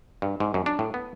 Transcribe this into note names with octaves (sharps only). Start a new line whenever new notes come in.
G2
G#2
F#2
D4
A2
B3